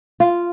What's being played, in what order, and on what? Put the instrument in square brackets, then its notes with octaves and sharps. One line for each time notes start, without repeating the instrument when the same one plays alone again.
[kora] F4